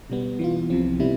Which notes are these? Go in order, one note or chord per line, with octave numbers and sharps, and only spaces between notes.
B2 G3 B3
E3 B3 F4
C2 C3 F3 C4
C3 G3 B3 E4